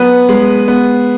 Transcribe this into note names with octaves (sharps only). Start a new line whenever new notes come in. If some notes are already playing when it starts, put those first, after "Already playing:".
Already playing: F#3 B3 B4
G#3
B3